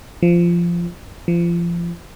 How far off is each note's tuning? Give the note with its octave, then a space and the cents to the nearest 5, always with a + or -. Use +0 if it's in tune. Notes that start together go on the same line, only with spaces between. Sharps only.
F3 -15
F3 -30